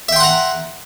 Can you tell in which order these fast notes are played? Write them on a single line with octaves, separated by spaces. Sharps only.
E5 G5 C6 F#5 A#5